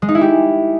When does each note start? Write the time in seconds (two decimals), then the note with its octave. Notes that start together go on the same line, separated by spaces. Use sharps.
0.02 G#3
0.08 D#4
0.15 E4
0.21 G4